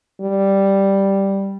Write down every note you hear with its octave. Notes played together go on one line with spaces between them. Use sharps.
G3